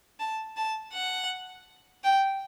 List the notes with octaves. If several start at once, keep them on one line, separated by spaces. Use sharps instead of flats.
A5
A5
F#5
G5